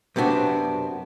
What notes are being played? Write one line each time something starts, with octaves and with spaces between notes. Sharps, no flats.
F#2 C3 B3 D4 F#4